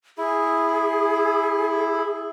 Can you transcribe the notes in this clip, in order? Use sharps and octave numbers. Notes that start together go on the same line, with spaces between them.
E4 G#4